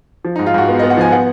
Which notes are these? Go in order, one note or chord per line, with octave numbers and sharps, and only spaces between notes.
F3
D#4
G#2
F4
G#2 F#4
B3
D#5
B3
F#5
F3 G#5
B3 F#5